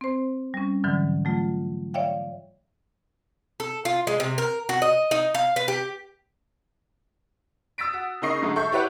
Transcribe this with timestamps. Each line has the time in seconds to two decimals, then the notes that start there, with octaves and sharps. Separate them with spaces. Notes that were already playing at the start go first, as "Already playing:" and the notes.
0.01 C4 C5
0.54 G3 C#4
0.84 G#2 D3 E3 F#3
1.25 F#3 A3 F4
1.94 C#5 D5 E5 F5 G5
3.60 A4
3.85 F4
4.07 G#3
4.20 C3
4.38 A#4
4.69 F#4
4.82 D#5
5.11 D#4
5.34 F5
5.56 B4
5.68 G4
7.78 D#6 E6 A6 B6 D7
7.93 F#4
8.22 C#3 A#3 D#4 D#5 C#6 C7
8.42 G#2 D3 F#3 A3 G#4
8.56 A4 E5 C#6 G6
8.72 E4 G4 B4 C#5 F#5